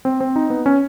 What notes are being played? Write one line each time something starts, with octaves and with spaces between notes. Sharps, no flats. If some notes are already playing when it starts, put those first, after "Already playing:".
C4
C4
D#4
B3
C#4